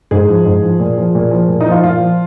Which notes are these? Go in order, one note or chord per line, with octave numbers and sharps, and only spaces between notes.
G#2 G#4
F3
G#2
F3
A#2
F3
A#2
F3
A#2
D#4
F3
F4
A#2 F4
F3